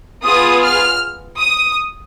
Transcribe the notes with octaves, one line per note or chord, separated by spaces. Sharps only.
B3 F4 G#4 D#6
F6
D#6